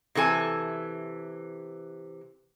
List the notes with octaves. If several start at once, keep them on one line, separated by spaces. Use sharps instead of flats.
C3 E3 A4 G#5